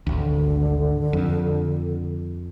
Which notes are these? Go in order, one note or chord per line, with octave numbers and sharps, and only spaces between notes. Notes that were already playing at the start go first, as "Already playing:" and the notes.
G#1 D2 D3
F2